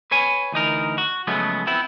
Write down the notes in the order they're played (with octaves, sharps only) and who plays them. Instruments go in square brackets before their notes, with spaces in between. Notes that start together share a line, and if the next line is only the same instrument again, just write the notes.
[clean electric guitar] B4 C#5 G#5
D2 E3 D#4 A#4
F#4
C#3 F3 F#3 G#3 A3 B3
B3 C4 E4